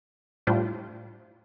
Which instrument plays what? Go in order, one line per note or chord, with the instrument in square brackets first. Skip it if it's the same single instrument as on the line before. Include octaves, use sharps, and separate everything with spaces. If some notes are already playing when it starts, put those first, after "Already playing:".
[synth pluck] A2 G3 D4 F4 C5